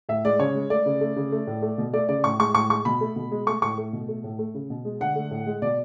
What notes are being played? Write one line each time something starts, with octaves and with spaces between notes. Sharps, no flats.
A2 E5
G#3 D5
C#3 C#5
G#3
A3 D5
C#3
A3
C#3
A3
A2
A3
B2
A3 D5
C#3 D5
A2 C#6
G#3 C#6
A2 C#6
G#3 C#6
B2 B5
A3
B2
G#3
A3 C#6
A2 C#6
A3
B2
A3
A2
A3
C#3
B2
G#3
D3 F#5
A3
A2
G#3
B2 D5